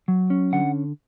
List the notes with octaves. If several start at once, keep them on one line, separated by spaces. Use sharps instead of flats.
F#3
C#4
D3 F#5